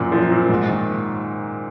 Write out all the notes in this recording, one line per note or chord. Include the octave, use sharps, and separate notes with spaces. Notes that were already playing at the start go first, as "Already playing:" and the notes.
Already playing: F#2 A#2 F3
F3
A#2
G#2
D#3